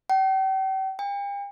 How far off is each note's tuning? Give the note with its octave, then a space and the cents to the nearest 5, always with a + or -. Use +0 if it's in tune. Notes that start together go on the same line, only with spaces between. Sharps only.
G5 -40
G5 +40